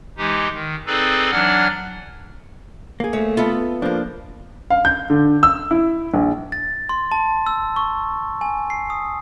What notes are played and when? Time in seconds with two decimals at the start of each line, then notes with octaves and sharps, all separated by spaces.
0.17 E3 G#3 D#4 G4
0.53 D#3
0.86 C4 D#4 G#4 A4 B4 D5
1.31 E3 F#3 D4 D5 F#5 F6
3.00 A#3 G#4
3.13 A3 C#5
3.37 B3 F4 A4 E5
3.82 F3 A#3 D4
4.70 F5
4.85 G6
5.10 D3
5.43 E6
5.71 E4
6.14 A#1
6.52 A6
6.89 C6
7.12 A5
7.46 E6
7.76 C#6
8.41 G#5
8.70 C7
8.90 D#6